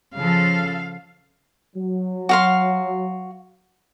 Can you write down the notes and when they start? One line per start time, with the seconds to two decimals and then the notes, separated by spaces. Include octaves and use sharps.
0.16 C#3 F3 A4 F5
1.76 F#3
2.29 F#4 F5 C6